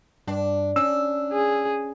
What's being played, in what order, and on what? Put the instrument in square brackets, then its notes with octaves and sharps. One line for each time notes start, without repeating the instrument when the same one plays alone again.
[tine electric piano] G2 [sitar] D4
[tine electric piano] C#4 [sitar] D4 [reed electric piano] E6
[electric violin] G#4